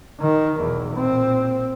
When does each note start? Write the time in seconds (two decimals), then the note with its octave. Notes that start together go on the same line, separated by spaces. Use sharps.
0.20 D#3
0.60 B1 E2
0.95 A#2 C4